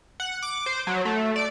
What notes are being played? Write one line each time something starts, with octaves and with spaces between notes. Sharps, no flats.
F#5
D6
C5
F#3
A3
D5